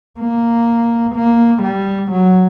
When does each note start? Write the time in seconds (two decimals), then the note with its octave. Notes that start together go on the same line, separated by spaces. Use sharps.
0.20 A#3
1.15 A#3
1.63 G3
2.12 F#3